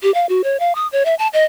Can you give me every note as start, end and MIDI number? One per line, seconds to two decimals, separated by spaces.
0.03 0.13 67
0.14 0.26 77
0.29 0.42 66
0.44 0.57 73
0.60 0.73 77
0.75 0.87 87
0.92 1.03 73
1.05 1.15 76
1.19 1.28 81
1.33 1.44 75